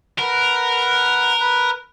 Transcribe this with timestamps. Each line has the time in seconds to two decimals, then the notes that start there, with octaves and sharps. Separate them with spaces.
0.18 A#4 B4 F#5
1.40 B4